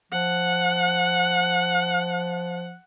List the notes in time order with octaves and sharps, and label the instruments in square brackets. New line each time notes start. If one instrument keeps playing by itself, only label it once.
[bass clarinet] F3 [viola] F#5